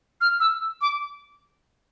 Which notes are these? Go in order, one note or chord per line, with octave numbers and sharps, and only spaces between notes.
F6
E6
D6